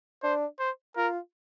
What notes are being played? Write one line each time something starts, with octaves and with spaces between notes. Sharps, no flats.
D4 C5
C5
F4 A#4